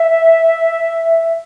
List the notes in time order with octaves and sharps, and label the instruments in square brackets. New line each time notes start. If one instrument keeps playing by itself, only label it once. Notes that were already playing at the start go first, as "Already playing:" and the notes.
Already playing: [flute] E5